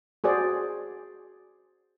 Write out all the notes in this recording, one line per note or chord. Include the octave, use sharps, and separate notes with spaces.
F#4 G#4 C5 D5